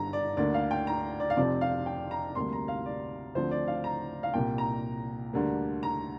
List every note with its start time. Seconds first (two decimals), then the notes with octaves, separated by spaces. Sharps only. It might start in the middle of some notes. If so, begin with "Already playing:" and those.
Already playing: G1 G2 D3 A#5
0.13 D5
0.37 D2 D3 A#3 D5
0.54 F5
0.71 G5
0.87 A#5
1.20 D5
1.30 F5
1.37 F1 F2 C3 F3 C4 D5
1.61 F5
1.86 G5
2.11 A#5
2.35 D2 C3 G3 A#3 C6
2.53 A#5
2.68 F5
2.86 D5
3.35 D2 D3 F3 C4 C5
3.51 D5
3.67 F5
3.84 A#5
4.23 F5
4.34 C2 A#2 A#3 G5
4.58 A#5
5.33 D2 D3 G3 A#3
5.83 A#5